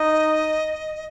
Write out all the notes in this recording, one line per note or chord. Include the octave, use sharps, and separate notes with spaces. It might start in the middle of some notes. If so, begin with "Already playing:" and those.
Already playing: D#4 D#5